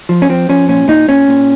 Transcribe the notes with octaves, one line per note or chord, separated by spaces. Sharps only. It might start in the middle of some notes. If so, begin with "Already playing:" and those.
F3
C#4
F3 C4
F3 C#4
A#2 C#4
A#2 D#4
A#2 C#4
A#2